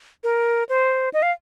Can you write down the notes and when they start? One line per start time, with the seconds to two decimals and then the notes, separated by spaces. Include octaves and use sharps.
0.24 A#4
0.69 C5
1.13 D#5
1.22 F5